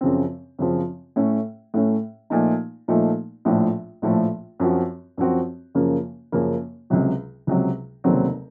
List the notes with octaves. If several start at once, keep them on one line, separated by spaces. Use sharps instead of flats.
F#2 C#3 F3 C4
F#2 C#3 F3 C4
A2 A3 C#4
A2 A3 C#4
A#2 F3 A3 D#4
A#2 F3 A3 D#4
A#1 A2 F3 A3
A#1 A2 F3 A3
F#2 F3 C4 F#4
F#2 F3 C4 F#4
F#2 C#3 F3 A#3
F#2 C#3 F3 A#3
C#2 C3 F#3
C#2 C3 F#3
F1 D#2 C#3 F#3 C4